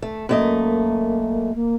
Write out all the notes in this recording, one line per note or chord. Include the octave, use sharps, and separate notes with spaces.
A3
F#2 A3 A#3 D#5
A#3